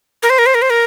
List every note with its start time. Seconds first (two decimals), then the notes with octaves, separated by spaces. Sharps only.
0.23 A#4
0.30 C5
0.39 A#4
0.46 C5
0.55 A#4
0.62 C5
0.70 A#4